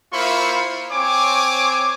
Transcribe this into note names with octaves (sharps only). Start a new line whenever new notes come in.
A#3 E4 F4 C5 B5 C#6
C4 C#5 G#5 D6